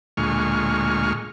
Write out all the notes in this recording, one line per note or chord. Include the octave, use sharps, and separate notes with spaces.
D2 A#2 G#3 C#6 F6